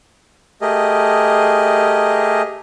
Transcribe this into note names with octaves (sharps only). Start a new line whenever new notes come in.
A3 G4 G#4 A#4 D#5